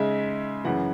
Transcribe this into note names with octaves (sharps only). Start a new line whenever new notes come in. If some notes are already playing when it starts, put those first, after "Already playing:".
Already playing: C#3 G#3 D#4 E5
F#2 C#3 E3 F#5